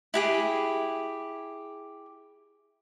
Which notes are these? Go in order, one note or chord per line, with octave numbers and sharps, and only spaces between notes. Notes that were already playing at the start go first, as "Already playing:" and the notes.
E4 G4 G#4